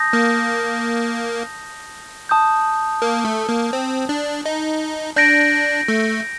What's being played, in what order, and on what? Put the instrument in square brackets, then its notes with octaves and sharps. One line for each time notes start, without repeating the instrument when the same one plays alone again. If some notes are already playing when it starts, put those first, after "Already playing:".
Already playing: [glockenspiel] A5 D#6 G6 A#6
[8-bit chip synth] A#3
[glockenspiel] A5 D#6 G6
[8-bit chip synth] A#3
A3
A#3
C4
D4
D#4
[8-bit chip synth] D4 [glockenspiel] G6 A#6 D7
[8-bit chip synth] A3